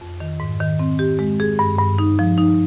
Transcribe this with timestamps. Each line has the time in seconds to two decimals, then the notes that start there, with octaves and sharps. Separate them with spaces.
0.01 F2
0.20 D#3
0.40 G#2
0.61 D#3
0.79 C4
0.99 G4
1.19 G#3
1.40 G#4
1.59 G2
1.78 G2
1.98 D#4
2.19 F3
2.38 D#4